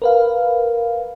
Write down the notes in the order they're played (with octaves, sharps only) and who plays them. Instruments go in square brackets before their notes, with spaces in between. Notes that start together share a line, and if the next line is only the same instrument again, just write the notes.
[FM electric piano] A#4 B4 F5